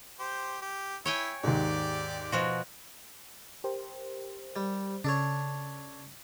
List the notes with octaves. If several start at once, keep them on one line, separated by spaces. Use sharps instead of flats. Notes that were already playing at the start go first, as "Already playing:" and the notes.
G4 C5
G4
E4 C#5 G5 G#5
D#2 G#2 G4 D5
B2 F3 F#4
G4 A#4 C5
G3
C#3 D4 A4 C#5